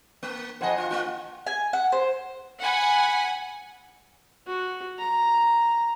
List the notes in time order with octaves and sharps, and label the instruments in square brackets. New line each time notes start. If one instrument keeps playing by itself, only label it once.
[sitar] A#3
[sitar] F2 D#5 [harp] C5 F#5 G#5
[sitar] F4
A#3 F4
[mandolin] G#5
F#5
C5
[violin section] F#5 G#5 B5
[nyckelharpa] F#4
A#5